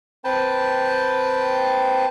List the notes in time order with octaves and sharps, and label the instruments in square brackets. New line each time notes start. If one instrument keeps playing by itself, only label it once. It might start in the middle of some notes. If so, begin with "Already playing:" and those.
[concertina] C4 B4 G5 A5